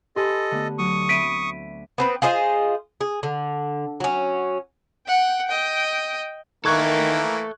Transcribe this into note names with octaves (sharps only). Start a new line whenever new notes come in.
G4 A4 B4 D#5 G#5 C6
D3 A3 B3
D2 F#3 C#6 D#6
C4 E5 B5 B6 D7 D#7
B3 C4 B4
F4 G#4 C5 D#5
G#4
D3
F#3 C#4
F#5 G5
D#5 G5
D#3 E3 A#3 A4 E5 C#6 F#6 G#6